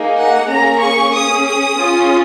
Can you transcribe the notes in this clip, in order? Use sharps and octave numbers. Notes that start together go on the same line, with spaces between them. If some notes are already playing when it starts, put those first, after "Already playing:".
Already playing: A#3 D#4 G#4
F#5
A#3 C#4 G#4 A#5
C#6
C#4 G#4 D#6
D#6
C#4 F4 G#4